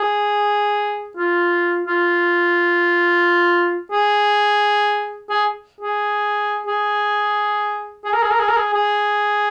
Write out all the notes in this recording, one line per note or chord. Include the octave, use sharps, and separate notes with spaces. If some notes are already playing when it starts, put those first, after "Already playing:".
Already playing: G#4
F4
F4
G#4
G#4
G#4
G#4
G#4
A#4
G#4
A#4
G#4
A#4
G#4
G#4